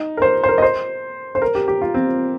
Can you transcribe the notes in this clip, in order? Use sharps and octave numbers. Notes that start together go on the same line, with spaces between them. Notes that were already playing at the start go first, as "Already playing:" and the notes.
Already playing: D#4
A#4
C5
C5
A#4
D#5
C5
C5
A#4
G4
G4
F4
C4